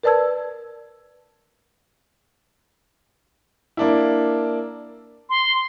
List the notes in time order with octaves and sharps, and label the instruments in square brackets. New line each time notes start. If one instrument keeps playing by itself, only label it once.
[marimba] A#4 B4 D5 A5 E6 G#6
[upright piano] A#3 D4 E4
[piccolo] C6